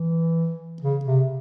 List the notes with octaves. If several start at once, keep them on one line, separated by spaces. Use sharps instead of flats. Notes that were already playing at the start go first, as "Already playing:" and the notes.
Already playing: E3
C#3
C3